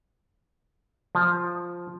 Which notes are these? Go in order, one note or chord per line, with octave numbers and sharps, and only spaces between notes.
F3